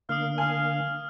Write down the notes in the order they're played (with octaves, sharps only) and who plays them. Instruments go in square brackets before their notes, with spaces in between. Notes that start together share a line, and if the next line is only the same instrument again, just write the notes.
[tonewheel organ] D3 A#3 [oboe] F5 [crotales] D#6 F6
[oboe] F5 [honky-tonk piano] G#5